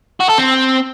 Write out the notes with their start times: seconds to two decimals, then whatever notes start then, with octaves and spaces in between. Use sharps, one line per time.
0.20 F#4
0.29 A4
0.38 C4